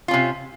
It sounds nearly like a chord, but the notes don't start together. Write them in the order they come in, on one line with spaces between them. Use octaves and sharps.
F4 C#4 C3